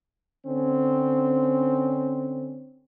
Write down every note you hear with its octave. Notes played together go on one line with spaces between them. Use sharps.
D3 C4 C#4